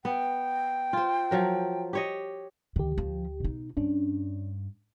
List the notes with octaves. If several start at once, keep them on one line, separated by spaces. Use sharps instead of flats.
B3 G5
F4 C5
F3 F#3 A#4
G4 C#5 D#5
D2 D#3 G4
F3
B2 D#4
G2 C#4 D4